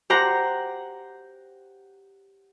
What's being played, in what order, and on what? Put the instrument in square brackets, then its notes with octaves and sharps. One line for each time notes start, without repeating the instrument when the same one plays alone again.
[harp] G4 C5 F#5 A#5